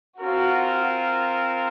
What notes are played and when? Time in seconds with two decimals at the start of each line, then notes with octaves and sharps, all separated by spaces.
0.20 C4 F4 F#4 A#4